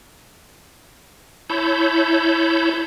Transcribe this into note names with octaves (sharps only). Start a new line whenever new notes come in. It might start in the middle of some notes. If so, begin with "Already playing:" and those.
E4 C#5 A5 B5 G6